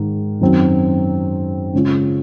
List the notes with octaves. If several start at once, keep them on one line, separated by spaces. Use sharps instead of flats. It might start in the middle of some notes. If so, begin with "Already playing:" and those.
Already playing: G#2 D#3 G#4
F#2 D#3 F#3 C4
C#3 G#3 C#4 F4